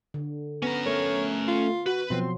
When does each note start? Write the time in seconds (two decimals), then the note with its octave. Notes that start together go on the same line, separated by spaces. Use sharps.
0.14 D3
0.62 B3 C#4 A#5 A#6
0.86 A3 A#4 C#5
1.48 F4
1.86 F#4 B4
2.10 B2 F3 F#3 C4 C6